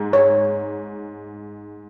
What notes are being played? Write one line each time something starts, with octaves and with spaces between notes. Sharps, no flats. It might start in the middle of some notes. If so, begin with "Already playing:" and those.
Already playing: G#2
C#5